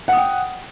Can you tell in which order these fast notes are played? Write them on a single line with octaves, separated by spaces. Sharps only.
F#5 D#6 G5